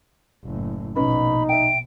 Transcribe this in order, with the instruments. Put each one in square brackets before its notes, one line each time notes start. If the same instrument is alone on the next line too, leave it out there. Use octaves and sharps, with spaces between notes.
[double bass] F#1 A2
[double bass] A#1 B2 [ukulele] C#4 F#4 B4 [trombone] D#4 [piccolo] B5
[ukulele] E5 G5 [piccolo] D7